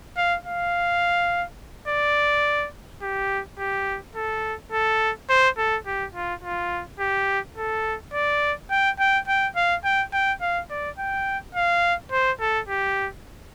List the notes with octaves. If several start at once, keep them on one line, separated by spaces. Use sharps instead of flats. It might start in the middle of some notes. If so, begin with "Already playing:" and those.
F5
F5
D5
G4
G4
A4
A4
C5
A4
G4
F4
F4
G4
A4
D5
G5
G5
G5
F5
G5
G5
F5
D5
G5
F5
C5
A4
G4